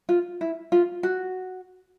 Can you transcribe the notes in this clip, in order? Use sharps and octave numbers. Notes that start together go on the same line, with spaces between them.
F4
E4
F4
F#4